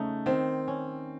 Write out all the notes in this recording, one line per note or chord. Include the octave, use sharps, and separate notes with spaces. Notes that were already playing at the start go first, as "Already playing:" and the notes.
Already playing: C#3 A3 D#4
D#3 C4
C#4